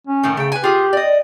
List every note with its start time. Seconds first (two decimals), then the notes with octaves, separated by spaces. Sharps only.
0.07 C#4
0.23 A2 D#3 A3
0.37 C#3 A3 G5
0.52 B4 G#5
0.64 F4 G4 G#4
0.93 D5 D#5